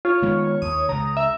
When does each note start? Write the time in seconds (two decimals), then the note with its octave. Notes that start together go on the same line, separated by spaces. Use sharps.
0.05 F4 C#5
0.22 D#3 G#3 B3
0.62 D#2 D#6
0.89 C#2 C#3 A#5
1.17 E5